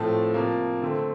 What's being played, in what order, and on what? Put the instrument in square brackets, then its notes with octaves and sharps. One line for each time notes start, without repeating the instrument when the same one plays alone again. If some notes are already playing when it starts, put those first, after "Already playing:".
Already playing: [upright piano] A2 F3 A3 C4 A5
C3 F3 A#3
D3 A3 C4